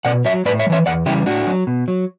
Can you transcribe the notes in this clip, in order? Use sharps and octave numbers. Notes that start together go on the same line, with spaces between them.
B2 D5 F#5
F#3 C#5 E5
A2 B4 D5
C#5 E5
G3
E3 C#5 E5
E2 D5 F#5
C#3 E3 G3 E4 G4
A2 D4 F#4
F#3
B2
F#3